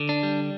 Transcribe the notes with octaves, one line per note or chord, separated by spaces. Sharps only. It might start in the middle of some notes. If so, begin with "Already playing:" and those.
Already playing: D3
D4
G3